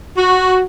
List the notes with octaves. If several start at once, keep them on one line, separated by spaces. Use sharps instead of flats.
F#4